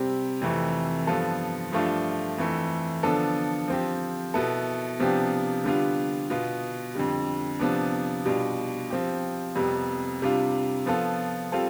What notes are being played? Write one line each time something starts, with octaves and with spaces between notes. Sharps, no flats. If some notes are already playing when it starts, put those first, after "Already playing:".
Already playing: C3 G3 C4 G4
F2 C3 E3 A3
G2 F3 B3 F4 A4
G2 F3 A3 D4 F4
F2 E3 A3
D3 F3 B3 D4 A4
F3 C4 G4
B2 B3 E4 A4
C3 F3 B3 D4 G4
D3 G3 B3 D4 F4
B2 B3 F4
F2 D3 G3
C3 F3 B3 D4
B2 G3 D4 F4
F3 C4 G4
F2 C3 G3 B3
C3 G3 D4 F4
F3 B3 F4 A4
G3 C4 F4 A4